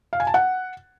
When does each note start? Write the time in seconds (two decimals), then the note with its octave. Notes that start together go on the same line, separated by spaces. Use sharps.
0.13 F5
0.20 G#5
0.27 A5
0.34 F#5